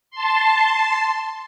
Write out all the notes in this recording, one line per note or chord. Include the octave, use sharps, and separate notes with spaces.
A5 C6